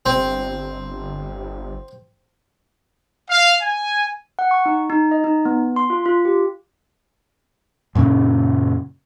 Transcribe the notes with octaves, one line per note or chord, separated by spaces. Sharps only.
G1 C4
F5
G#5
F#5
C#6
D#4
D#4
D#5
D#4
B3
C6
F4
F4
G4
F#2 A#2 C#3 C#4